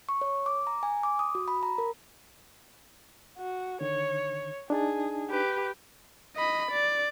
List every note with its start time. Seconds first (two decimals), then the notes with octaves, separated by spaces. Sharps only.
0.09 C#6
0.21 C#5
0.46 D6
0.67 A#5
0.83 G#5
1.03 D6
1.19 D#6
1.35 F#4
1.48 B5
1.63 A#5
1.78 A#4
3.38 F#4
3.81 D3 D#3 C#5
4.70 D4 D#4 G#4 A5
5.30 G4 B4
6.36 D#5 B5
6.71 D5